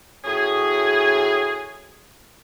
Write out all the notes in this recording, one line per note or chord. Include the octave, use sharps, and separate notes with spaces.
A2 C#4 F#4 G#4